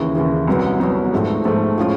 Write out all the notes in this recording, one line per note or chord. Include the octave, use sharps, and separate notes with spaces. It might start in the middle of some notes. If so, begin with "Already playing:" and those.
Already playing: D#2 C#3 E3
D#2 C#3 E3
C2 B2 F#3 B3
C2 B2 F#3 B3
G#2 F3 A3 C4
G#2 F3 A3 C4
A2 F3 G#3 C#4 F4